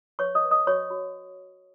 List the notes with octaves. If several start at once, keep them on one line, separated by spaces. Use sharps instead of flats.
B4 C#5 C#6
D#5 D#6
B4
D#5 D#6
F#4 C#5 C#6
F#4